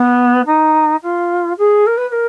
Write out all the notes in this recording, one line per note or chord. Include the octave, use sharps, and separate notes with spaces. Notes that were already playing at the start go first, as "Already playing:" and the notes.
Already playing: B3
D#4
F4
G#4
A#4
B4
B4
A#4